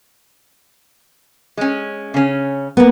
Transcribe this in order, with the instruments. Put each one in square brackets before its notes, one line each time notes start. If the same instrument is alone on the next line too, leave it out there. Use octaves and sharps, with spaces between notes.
[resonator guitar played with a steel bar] G#3 C#4
C#3 C#4
[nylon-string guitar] A#3 B3